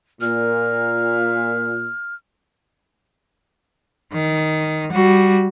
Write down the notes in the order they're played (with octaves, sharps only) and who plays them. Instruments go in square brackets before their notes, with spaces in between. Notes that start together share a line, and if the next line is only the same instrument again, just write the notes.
[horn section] A#2 [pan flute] F6
[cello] D#3
G3 F#4